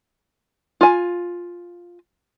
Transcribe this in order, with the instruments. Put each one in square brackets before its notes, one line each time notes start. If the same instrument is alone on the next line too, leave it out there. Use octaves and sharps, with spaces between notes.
[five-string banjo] F4 G#5